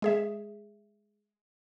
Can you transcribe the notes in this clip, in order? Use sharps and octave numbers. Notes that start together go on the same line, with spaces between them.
G#3 G#4 E5